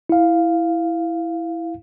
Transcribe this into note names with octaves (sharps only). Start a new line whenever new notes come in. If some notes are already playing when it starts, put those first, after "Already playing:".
E4 F5